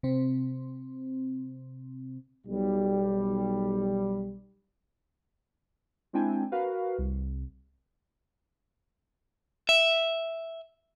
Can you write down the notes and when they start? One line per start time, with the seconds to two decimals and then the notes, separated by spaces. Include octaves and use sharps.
0.03 C3 C4
2.47 B1 G3
6.13 G#3 C4 D4 E4 G5 G#5
6.52 F#4 A#4 B4 F5
6.98 C2
9.69 E5